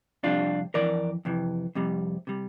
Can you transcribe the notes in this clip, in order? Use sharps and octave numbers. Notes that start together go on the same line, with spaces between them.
F2 C3 G3 D4 F4
F2 C3 E3 A#4 D5
F2 C3 E3
F2 C3 G3
C3 G3